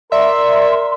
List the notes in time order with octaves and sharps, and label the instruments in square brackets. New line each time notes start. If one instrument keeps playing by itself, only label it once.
[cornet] A#4 [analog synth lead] D5 [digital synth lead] E5 [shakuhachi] C6